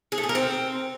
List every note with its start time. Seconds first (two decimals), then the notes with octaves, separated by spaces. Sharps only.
0.12 G#4
0.18 A3
0.23 G#4
0.29 A#4
0.35 C4